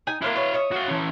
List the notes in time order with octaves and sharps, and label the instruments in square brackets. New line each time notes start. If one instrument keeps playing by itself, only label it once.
[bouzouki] D#4 G#5
[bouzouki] A#3 C4 D4 [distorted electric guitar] E4 F5
[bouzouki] B4 C#5
C#5 D#5 E5
[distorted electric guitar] F#4 F5
E3 C#4